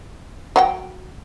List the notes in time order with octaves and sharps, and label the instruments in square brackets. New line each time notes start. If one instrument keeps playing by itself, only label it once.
[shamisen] F#3 F#5 G5